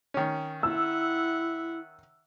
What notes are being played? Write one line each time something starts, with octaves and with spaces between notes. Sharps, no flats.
D#3 C#4
E4 E5 F#5 E6